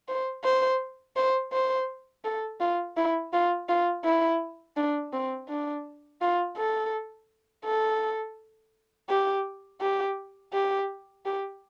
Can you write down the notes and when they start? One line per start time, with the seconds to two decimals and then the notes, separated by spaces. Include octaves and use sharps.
0.08 C5
0.44 C5
1.16 C5
1.52 C5
2.25 A4
2.60 F4
2.97 E4
3.33 F4
3.69 F4
4.04 E4
4.77 D4
5.13 C4
5.49 D4
6.21 F4
6.57 A4
7.65 A4
9.09 G4
9.81 G4
10.53 G4
11.26 G4